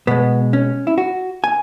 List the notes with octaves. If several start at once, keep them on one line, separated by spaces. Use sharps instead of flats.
B2 G#3 B3
C#4
E4
F#4
G#5